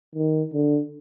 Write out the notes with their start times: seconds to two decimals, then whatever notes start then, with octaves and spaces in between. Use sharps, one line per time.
0.16 D#3
0.54 D3